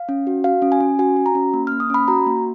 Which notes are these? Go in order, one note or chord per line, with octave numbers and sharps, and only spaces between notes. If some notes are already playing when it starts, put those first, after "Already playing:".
Already playing: F5
C#4
F#4
F#4 F5
C#4
G#5
C#4
F#4 G#5
F#4
A#5
C#4
A#3
A#3 F6
D#6
C#4 B5
F#4 A#5
A#3